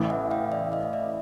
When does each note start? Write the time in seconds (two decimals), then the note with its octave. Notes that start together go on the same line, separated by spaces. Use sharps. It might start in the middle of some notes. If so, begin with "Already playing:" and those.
Already playing: A1 A2 E3
0.10 E5 F#5
0.31 F5 G5
0.52 D5 E5
0.72 D#5 F5
0.93 D5 E5